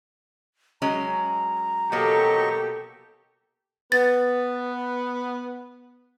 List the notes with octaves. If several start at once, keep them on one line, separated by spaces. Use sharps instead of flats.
F#3 G#3 C#4 A#5
B2 F#3 A#3 G4 A4 D#5 C#6
B3 A6